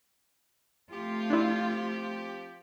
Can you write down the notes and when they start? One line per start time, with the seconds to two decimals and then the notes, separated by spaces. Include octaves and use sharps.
0.91 F3 A3 C4 F4 G4
1.30 D4 E4